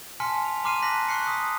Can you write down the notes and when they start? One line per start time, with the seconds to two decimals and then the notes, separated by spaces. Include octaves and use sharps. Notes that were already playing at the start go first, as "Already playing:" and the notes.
0.20 G#5 A5 C6 F6 B6 C#7
0.45 G#5 F7
0.64 A#5 C6 D6 F6 C7 D#7
0.82 A5 F#6 A#6 B6 F#7
1.08 C#6 F#6 C7 C#7
1.27 D#6 B6